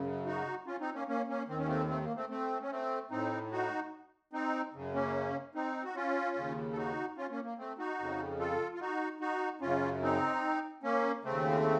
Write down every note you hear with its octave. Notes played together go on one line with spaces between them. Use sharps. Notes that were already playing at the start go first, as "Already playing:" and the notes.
Already playing: F#2 C#3
D#4 F#4
C#4 F4
C4 D#4
A#3 C#4
A#3 C#4
A#3 C#4
D#2 D#3 C4
C#4
A3 C4
A3 C4
A#3
A3 C4
A3 C4
C#4
A3 C4
A2 C4 D#4
D#4 F#4
C4 D#4
F#2 C#3
A#3 C#4
C4 D#4
F#4
C#4 F4
D#2 C#3
A4
D#4 F#4
C#4 F4
A#3 C#4
A#3
A3 C4
D#4 F#4
F2 C#3
F4 A4
F4
D#4 F#4
D#4 F#4
F#2 C#3 C#4 F4
C4 D#4
A#3 C#4
D#2 C#3 A3 C4